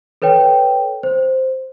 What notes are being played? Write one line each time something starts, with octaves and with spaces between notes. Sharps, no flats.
A4 B4 C#5 G5
C5